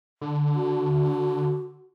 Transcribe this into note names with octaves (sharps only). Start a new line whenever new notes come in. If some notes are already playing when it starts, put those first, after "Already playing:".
D3
F#4